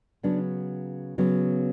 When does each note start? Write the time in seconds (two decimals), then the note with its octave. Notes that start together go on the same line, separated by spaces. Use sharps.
0.23 C#3 F#3 B3 D4
1.18 C#3 F#3 B3